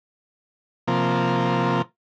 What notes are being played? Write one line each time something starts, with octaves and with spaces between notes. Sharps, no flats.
C3 F3 A#3